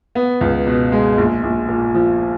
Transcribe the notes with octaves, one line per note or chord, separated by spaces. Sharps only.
B3
C#2
B2
G#3
A#1
A#1
A#2
F3